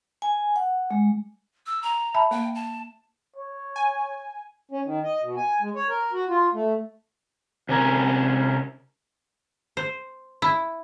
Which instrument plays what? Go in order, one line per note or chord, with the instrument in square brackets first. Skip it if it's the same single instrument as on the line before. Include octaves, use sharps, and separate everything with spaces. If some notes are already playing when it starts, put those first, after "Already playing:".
[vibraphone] G#5
F#5
G#3
[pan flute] E6
A#5
[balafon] E5 A5 B5
[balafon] A#3 [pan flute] G5
[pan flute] A5
[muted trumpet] C#5
[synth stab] G#5
[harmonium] C#4
D#3
D#5
B2
G#5
G#3
C#5
A#4
F#4
F4
A3
[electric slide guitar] C3 C#4 A#4
[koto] C5
E4